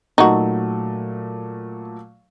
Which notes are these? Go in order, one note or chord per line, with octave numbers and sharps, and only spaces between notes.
A#2 F#3 A3 D#4 F#4